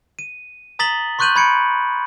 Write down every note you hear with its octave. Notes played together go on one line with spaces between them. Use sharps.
D#7
A#5 D#6 A6 B6 F#7 G7
C6 C#6 F#6 G6 D#7 F#7
B5 G#6 C#7 D7